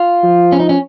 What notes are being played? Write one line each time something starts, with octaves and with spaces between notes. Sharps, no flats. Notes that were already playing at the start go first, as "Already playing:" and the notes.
Already playing: F4
F3
C#4
D#4
C#4